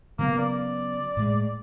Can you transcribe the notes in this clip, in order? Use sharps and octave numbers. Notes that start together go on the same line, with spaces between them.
C#3 F#3 A#3 B3
D5
A2 G#3